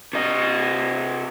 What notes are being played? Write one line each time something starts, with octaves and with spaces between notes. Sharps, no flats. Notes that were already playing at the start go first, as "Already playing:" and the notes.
C3 D#5